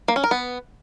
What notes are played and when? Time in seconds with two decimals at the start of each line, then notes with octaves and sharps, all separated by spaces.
0.08 A#3
0.16 C#4
0.24 A#4
0.31 B3